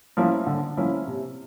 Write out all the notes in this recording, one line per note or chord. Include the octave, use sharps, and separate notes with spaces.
F3 A#3 C#4 E4
D3
F3 A#3 C#4 E4
C3